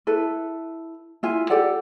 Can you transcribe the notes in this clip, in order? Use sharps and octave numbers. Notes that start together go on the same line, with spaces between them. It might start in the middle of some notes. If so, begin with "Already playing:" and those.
E4 A4 B4
E4 F4 G#5
G4 A4 D5 F#5